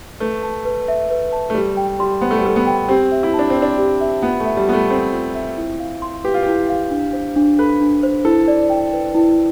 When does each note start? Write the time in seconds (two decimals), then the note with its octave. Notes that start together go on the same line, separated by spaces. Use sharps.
0.20 A3 B4
0.43 A5
0.65 B4
0.88 E5
1.11 B4
1.33 A5
1.50 A3
1.55 G3 A4
1.77 G5
1.99 G3 C6
2.21 B3 C5
2.31 A3
2.38 G3
2.44 A3 A4
2.56 B3
2.67 G5
2.88 C4 G4
3.12 E5
3.23 E4
3.34 A5
3.39 D4
3.50 C4
3.56 C5
3.62 D4
3.78 G4
4.01 E5
4.23 B3 F4
4.40 A3
4.46 E5
4.57 G3
4.68 B3 F4
4.73 A3
4.90 C4 A4
5.13 F4
5.35 E5
5.57 E4
5.80 F5
6.02 C6
6.24 G4 B4
6.34 F4
6.43 E4 G4
6.69 F5
6.91 D4
7.13 C5
7.36 D4
7.59 A4 B4
7.81 D4
8.03 C5
8.25 E4 A4
8.48 D5
8.70 G5
8.93 B4
9.15 E4